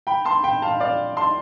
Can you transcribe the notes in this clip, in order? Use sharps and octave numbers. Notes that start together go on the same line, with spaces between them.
G5 B5
A5 C6
G5 B5
F5 A5
D5 F5
A5 C6